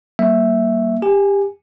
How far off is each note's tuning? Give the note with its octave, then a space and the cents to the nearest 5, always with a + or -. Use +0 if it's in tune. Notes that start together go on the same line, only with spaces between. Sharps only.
G3 -35 A#3 +0 E5 +0
G4 +20 G#5 +0